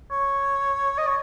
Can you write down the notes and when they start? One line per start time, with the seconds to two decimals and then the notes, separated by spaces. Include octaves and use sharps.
0.11 C#5
0.98 D#5
1.07 C#5